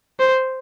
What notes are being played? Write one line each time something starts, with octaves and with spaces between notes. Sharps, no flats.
C5